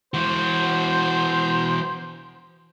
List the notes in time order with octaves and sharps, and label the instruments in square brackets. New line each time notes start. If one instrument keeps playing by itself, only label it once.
[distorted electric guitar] E3 F#4 [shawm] C5